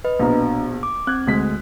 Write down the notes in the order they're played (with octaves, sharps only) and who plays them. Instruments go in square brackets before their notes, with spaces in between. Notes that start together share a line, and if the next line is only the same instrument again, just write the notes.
[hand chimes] B4 D#5
[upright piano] A#1 B2 [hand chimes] D4 A#5
[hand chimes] D6
[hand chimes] C4 G#6 [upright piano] F#6
[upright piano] D2 G#3 B6